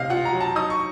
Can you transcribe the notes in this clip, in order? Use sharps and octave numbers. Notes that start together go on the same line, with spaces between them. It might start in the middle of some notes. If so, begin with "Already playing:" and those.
Already playing: C3 C4 D#5 F5
F4 F#5
A#5
F#3
A5
D#4 D#6
C#6